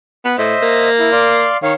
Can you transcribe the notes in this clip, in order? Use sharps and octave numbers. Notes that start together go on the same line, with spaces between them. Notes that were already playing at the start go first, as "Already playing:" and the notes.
B3
A2 C5 D#5 E5
A#3
E4
D5 F5 C6
D#3 C#5 F5